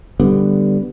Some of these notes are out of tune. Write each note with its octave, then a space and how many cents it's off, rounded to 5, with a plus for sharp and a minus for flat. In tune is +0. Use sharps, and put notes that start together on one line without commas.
D3 +0 G3 +0 B3 +0